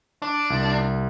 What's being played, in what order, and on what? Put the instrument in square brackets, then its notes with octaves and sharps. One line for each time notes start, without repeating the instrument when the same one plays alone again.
[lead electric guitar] D4
[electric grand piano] C2